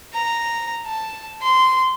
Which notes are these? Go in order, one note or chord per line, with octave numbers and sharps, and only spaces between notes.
A#5
A5
C6